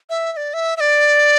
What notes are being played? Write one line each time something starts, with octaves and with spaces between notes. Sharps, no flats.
E5
E5
D5
E5
E5
D5